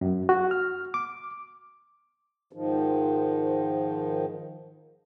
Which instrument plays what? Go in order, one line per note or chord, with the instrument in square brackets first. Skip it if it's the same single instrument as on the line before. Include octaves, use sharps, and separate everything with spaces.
[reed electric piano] F#2
F#4
F6
D6
[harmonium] G#2 D#3 F3